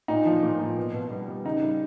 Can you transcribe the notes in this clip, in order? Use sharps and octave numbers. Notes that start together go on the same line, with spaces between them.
A#2 D#4
F3
A#2
A#2
B2
B2
G3
G3
C#3 D#4
G3